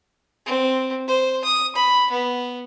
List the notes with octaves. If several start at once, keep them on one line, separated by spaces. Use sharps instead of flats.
C4
C5
D#6
B5
B3